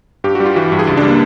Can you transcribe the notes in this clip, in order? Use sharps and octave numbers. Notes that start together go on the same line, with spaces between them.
G2 G4
G3 F#4
F4
E3 F#4
G2
G#4
C#2 G4
D4
G3 A#3